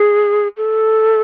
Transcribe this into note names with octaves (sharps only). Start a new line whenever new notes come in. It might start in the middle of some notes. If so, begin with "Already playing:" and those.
Already playing: G#4
A4